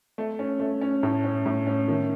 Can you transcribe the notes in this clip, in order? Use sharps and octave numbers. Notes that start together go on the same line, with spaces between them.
A3
C#4
A3
C#4
A2
C#4
A2
C#4
D#3